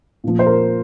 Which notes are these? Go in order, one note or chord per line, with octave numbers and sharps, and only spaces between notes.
A#2 F3
C5
A#4